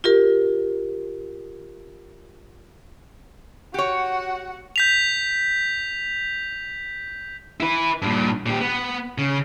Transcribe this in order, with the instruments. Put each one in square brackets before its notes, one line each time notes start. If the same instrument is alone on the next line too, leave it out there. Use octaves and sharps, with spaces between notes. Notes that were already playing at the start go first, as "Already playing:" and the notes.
[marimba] F4 G4 A#4
[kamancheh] F#4 F#5 [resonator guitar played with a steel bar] G4 C#5
[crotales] G6 B6 F7
[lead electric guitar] E4 B4
G2 A#2
A#2 G4
B3
C#3